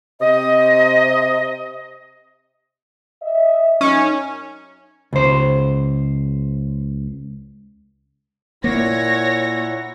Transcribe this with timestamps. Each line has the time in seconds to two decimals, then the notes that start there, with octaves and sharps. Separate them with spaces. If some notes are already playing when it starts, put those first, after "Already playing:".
0.21 C3 D#5
3.22 D#5 E5
3.81 F#2 C#4 D#4 D#5
5.13 C#2 C5
8.64 A#2 A#3 E4 C#5 F#5 A#6